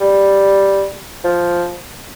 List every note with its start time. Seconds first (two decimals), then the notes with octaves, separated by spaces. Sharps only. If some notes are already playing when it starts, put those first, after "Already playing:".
0.01 G3
1.25 F3